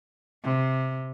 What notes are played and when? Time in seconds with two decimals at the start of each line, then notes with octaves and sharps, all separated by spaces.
0.44 C3